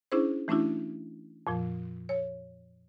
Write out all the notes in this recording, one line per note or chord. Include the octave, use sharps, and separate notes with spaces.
C#4 D4 E4 G#4 C5
E3 A3 C#4 D4 E4 F#4
F2 A#2 F3
C#5